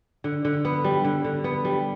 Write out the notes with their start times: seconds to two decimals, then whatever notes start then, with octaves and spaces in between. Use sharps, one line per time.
0.24 D3
0.45 D3
0.65 B3
0.84 G3
1.05 D3
1.25 D3
1.44 B3
1.65 G3